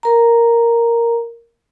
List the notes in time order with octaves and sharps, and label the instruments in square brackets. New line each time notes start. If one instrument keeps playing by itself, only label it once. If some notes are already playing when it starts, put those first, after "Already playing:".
[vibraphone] A#4 A#5